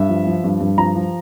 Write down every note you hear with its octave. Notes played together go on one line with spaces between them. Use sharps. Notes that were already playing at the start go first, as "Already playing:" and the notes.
Already playing: G2 E5
F3
F3
G2
G2
F3 A#5
F3